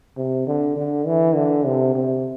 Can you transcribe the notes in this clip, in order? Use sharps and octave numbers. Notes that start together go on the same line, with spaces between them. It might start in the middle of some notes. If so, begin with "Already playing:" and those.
C3
D3
D3
E3
D3
C3
C3